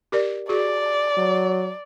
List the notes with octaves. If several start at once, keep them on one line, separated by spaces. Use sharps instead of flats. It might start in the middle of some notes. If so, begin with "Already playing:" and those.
G4 A#4 D5
F#4 G#4 D5
F#3